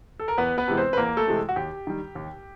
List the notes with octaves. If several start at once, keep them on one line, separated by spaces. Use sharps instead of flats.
A4
A#4
E2 B3 B4
B3 B4
C3 E3 G#3
C4 C5
B4
E2 A#3 A#4
A3 A4
C3 E3 G#3
F#4
D#2 G4
D#3 G3
D#2